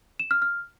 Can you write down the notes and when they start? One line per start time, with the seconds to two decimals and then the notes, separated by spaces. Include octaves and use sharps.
0.19 E7
0.31 F6
0.42 F6